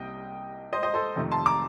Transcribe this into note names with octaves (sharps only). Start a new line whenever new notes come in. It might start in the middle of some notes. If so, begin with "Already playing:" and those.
Already playing: C2 C3 G3 A#3 D#5 G5
C5 D#5
C5 D#5
A4 C5
F2 C3 D#3 A3
A5 C6
A#5 D6